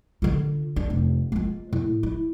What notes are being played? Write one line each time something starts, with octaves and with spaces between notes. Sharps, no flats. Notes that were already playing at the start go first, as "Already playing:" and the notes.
D3 F4
D4
F1
G#3 F4
A2
E4